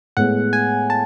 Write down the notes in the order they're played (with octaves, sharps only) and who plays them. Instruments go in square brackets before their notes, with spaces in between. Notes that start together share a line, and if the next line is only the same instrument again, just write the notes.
[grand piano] A2 G#3 B3 [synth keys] F#5
[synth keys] G#5
A5